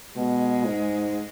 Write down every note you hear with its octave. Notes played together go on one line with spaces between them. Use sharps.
B2 G#3
G#2